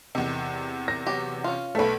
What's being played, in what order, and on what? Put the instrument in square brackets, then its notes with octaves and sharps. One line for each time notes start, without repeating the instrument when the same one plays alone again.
[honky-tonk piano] E2 C3 [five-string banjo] D#3
[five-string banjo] A#4 [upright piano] A#6
[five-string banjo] F#3 B3 G4
C#4 F4
[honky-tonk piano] B1 A3 [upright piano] A4 B4